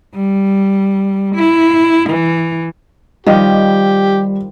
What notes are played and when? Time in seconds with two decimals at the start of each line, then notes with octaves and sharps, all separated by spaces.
0.15 G3
1.35 E4
2.09 E3
3.26 D#3 F3 G3 G4 D#5